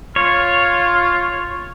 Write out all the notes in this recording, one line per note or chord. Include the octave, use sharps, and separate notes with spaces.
F4 C#5